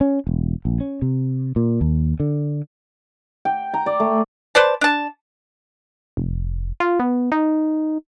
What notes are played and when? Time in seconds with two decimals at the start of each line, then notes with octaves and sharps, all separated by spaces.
0.01 C#4
0.27 E1
0.65 A#1
0.81 C#4
1.02 C3
1.56 A#2
1.81 D#2
2.20 D3
3.45 G5
3.74 A#5
3.86 D5
4.00 A3
4.55 B4 C5 D5 A5
4.81 D4 A5
6.17 F1
6.80 F4
7.00 B3
7.32 D#4